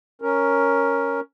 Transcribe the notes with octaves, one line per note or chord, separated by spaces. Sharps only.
C#4 A#4